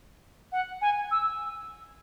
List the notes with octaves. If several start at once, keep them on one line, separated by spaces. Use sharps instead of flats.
F#5
G#5
E6